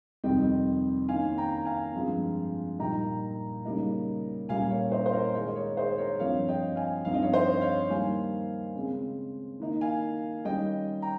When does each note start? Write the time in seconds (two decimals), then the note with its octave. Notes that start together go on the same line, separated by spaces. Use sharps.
0.24 F2 C3 D#3 G3 C4 D#5 G5
1.09 D#3 A#3 C#4 F5 G#5
1.38 G5 A#5
1.65 F5 G#5
1.94 G2 F3 G#3 C4
2.79 A#2 G3 A#3 D#4 G5 A#5
3.65 C#3 G3 A#3 D#4
4.49 A#2 G3 A#3 C#4 F5 G#5
4.70 C#5 F5
4.92 C5 D#5
5.06 C5
5.13 A#4 C#5
5.35 D#3 G#3 D#4 A#4 C#5
5.48 D#5
5.56 A#4 C#5
5.77 G#4 C5
5.98 A#4 C#5
6.19 G2 F3 C4 C#5 F5
6.48 D#5 G5
6.76 F5 G#5
7.05 G2 F3 C4 D#4 F5
7.14 D#5
7.23 C#5 F5
7.33 C5 D#5
7.61 C#5 F5
7.89 D#3 G3 A#3 F5 G#5
8.75 C#3 G#3 C4
9.60 D#3 A#3 D#4
9.81 F5 G#5
10.45 D#3 G3 C#4 D#5 G5
11.02 G5 A#5